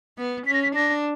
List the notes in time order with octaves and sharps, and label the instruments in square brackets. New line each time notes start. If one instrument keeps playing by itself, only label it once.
[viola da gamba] B3
[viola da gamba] C#4 [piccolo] B6
[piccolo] A#6
B6
[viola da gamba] D4 [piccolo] A#6